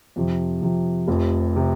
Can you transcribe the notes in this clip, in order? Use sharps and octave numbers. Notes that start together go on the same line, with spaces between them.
F2 C3 F3
F2 C3 F3
F1 F2 C3
C3